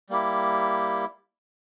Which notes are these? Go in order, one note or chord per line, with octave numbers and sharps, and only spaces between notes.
G3 A#3 E4 G4